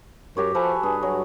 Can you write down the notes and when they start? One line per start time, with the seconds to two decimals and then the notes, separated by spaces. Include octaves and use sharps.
0.37 F#2 F#4 G4 C#5
0.55 F3 A4 B4 G#5
0.83 G2 G#4
1.03 F#3